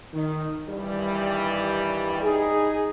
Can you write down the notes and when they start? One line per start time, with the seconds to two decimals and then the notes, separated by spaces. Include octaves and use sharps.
0.13 D#3
0.68 G2 D#3 E3 G3
2.21 D#4 G#4